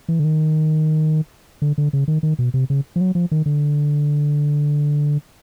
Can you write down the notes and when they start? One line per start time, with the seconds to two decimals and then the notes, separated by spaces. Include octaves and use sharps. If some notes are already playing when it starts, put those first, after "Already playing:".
0.09 E3
0.19 D3
0.24 D#3
1.62 D3
1.78 D3
1.93 C#3
2.08 D#3
2.23 D#3
2.39 B2
2.54 C3
2.70 C#3
2.96 F3
3.01 F#3
3.15 F3
3.31 D#3
3.46 D3